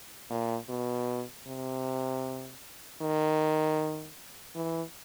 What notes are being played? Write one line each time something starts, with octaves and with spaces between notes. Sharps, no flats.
A#2
B2
C3
D#3
E3